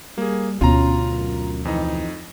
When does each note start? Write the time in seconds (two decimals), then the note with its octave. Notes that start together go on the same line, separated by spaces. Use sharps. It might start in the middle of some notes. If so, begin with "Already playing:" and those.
0.18 G3 A#3 G#4
0.61 D2 B2 C#4 F4 A#5
1.11 F#2
1.65 F2 E3 D#4